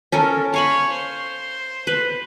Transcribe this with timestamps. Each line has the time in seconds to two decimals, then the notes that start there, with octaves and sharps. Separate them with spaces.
0.12 C#4 A4 A#4
0.54 C#5 F5 G#5 B5
0.93 C5
1.87 B4